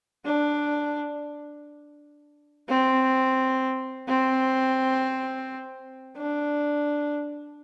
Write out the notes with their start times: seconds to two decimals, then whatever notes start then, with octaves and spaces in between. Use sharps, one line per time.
0.26 D4
2.69 C4
4.08 C4
6.17 D4